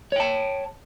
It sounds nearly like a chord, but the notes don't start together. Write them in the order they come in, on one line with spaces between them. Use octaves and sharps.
C#5 G5 A5